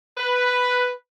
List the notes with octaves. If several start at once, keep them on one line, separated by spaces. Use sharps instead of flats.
B4